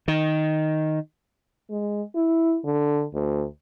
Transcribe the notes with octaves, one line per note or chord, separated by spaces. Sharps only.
D#3
G#3
E4
D3
D2